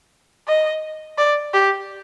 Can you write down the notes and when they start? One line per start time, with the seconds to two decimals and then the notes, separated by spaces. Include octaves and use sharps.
0.48 D#5
1.18 D5
1.54 G4